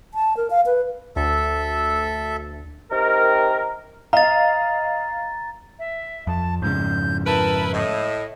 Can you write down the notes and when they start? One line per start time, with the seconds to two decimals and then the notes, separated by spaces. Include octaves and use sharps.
0.14 A5
0.37 A#4
0.50 F5
0.66 B4
1.16 D2 A4 E5
2.91 C3 D#3 A#4
4.13 D#5 F5 A#5 A6
5.79 E5
6.27 F2 A5
6.62 F2 G#2 C#3 G6
7.26 E4 A#4 B4 A5
7.73 A2 D#5